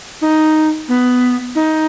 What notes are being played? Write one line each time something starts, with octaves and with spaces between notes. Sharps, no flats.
D#4
B3
D#4